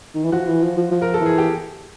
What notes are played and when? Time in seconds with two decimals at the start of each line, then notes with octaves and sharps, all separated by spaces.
0.15 D#3
0.24 E3
0.32 F3 F#4
0.47 E3
0.62 F3
0.77 F3
0.91 F3
1.02 A#4
1.14 A4
1.21 E3
1.26 G#4
1.38 G4